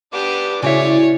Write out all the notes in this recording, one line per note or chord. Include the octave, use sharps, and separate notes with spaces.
B3 D4 G4 D6
C#3 G#3 E4 F#4 C#5 D5 E5